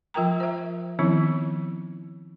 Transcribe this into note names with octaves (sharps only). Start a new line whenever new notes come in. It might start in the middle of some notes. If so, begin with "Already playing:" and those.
F3 F4 A#4 G5 A#5
C5 E5
D#3 F3 B3 C4 D#4 E4